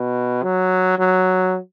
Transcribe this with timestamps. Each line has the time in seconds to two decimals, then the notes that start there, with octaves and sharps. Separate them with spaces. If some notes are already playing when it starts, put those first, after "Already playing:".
Already playing: B2
0.43 F#3
0.98 F#3